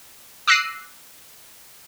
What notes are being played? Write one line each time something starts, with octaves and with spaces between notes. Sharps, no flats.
D6 E6 F#6 A#6 C7 D#7